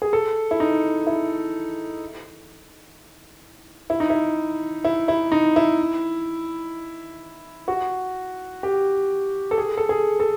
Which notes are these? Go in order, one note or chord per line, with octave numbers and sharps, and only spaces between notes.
G#4
A4
E4
D#4
E4
E4
D#4
E4
E4
E4
D#4
E4
F#4
G4
A4
G#4
A4
G#4
A4